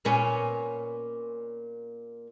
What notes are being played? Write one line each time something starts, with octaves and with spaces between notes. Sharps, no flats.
A#2 B3 C#4